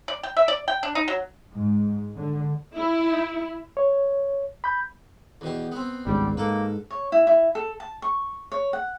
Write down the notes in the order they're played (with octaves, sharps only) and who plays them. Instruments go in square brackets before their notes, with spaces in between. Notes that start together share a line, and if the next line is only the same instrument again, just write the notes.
[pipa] D5
G5
E5
D5
G5
D4
D#4
F#3
[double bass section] G#2
D3
[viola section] E4
[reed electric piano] C#5
B5 G6
[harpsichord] E2 B2 G4
B3 C4
[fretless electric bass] G#1 C#2 G#2 [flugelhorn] G3
[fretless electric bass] G#2 [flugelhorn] A#3 [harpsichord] A4 B4
[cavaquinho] C#5
E4
E4
A4
A5
C#6
C#5
F#5